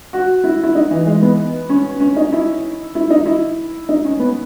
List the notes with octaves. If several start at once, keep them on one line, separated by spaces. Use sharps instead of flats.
F#4
E4
E4
D#4
E3
G#3
B3
C#4
C#4
D#4
E4
E4
D#4
E4
D#4
C#4
B3